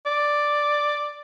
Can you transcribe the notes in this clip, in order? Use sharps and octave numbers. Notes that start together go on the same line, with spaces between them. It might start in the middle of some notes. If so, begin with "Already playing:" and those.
D5